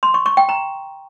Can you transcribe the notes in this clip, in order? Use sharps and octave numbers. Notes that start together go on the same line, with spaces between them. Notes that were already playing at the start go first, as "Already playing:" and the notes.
C6
C#6
C#6
G5
A#5